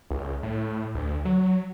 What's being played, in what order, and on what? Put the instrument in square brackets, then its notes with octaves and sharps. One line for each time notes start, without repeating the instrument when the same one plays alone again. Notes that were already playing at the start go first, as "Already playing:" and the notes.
[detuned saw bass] C#2
A2
D2
F#3